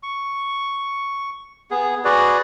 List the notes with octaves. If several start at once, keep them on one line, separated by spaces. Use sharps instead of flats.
C#6
B3 G#4
F#4 G#4 B4 D5